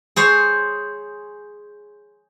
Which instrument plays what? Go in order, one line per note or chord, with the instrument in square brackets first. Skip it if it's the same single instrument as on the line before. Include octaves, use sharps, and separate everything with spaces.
[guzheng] G#4 C5 C#5